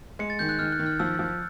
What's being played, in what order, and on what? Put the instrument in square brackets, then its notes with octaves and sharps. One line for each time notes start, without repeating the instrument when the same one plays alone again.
[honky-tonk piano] G#3 [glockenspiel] C#7
[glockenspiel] A6
[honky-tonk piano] D#3 [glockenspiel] G6
[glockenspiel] F#6
[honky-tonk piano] D#3 [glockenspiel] F6
[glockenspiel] F#6
[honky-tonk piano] D#3
[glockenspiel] F6
[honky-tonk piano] F3 [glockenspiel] E6
[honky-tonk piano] F3